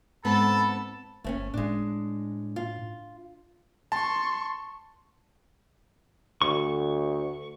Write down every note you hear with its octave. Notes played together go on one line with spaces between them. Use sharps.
G#2 B3 C4 A4 A5 B5
G1 A3 C4 C#4
A2 G#3 D4
F4
A5 C6 C#6
D2 C#6